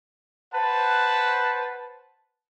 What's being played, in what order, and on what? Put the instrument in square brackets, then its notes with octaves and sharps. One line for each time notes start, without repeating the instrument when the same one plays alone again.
[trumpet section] B4 C5 F#5 A5